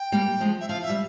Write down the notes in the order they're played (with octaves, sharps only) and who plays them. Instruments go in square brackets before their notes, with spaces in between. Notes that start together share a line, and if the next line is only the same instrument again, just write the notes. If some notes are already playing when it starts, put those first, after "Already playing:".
Already playing: [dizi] G5
[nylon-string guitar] G3 A#3
F3 G#3
[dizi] E5
[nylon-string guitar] F3 [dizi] F5
[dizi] E5
[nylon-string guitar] G3